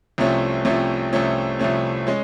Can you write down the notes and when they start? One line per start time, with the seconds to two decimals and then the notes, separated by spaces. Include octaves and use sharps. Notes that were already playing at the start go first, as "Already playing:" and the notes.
0.18 C2 C3 F3 A3 C#4
0.65 C2 C3 F3 A3 C#4
1.13 C2 C3 F3 A3 C#4
1.59 C2 C3 F3 A3 C#4
2.07 G#3 C#4